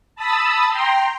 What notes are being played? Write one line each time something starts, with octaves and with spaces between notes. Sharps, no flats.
A5 B5 D#6 E6
G5 A#5 C6